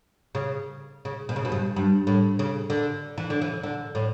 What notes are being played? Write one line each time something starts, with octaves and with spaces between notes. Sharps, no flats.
C#3
C#3
B2
C#3
B2
G2
G2
A2
C#3
D3
E3
D3
E3
D3
A2